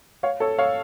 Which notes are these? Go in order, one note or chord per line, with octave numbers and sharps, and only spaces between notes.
C#5 F5
A4 C#5
C#5 F5